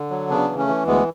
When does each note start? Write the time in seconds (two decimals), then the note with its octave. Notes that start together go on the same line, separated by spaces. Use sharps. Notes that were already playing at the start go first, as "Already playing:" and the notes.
Already playing: D3
0.10 F#3
0.29 C#3 B3 D4
0.49 E3
0.58 A3 C#4
0.68 E3
0.87 D2 G#3 B3